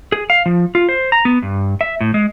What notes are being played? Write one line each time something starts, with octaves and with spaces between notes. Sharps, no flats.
G#4
F5
F3
F4
C5
A#5
B3
G2
E5
A2
G#3